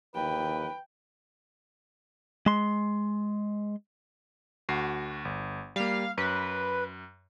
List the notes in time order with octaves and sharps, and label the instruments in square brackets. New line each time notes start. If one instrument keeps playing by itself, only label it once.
[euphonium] D#2 [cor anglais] B4 [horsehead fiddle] G5
[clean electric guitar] G#3 C6
[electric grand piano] D2 F#4 C7
G1
[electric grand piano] G3 A#3 [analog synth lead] F5
[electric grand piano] F#2 [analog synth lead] B4